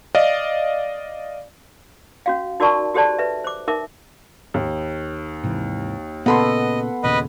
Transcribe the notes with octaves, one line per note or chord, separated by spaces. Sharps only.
D5 D#5 F5
C#4 F#4 F5
D#4 F#4 A#4 D5 A5 C#6
F#4 G4 A4 C5 D5 A5
B4 E5
C5 D6
D#4 A#4 E5 D6
D#2
G#2 C3 E3
A#2 C#3 B3 A4 D#5 F#5 B5 C6
D#2 A#2 C#3 B4 D#5